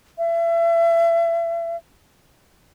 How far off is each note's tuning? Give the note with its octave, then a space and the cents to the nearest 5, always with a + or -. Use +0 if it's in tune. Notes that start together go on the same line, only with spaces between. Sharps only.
E5 +35